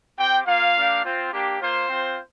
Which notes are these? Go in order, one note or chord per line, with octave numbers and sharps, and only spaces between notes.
C4 G4 G5
A#3 F4 F5
A#3 D4 G4
C4 F4
A#3 D4 G4
A#3 F4 C5
C4 F4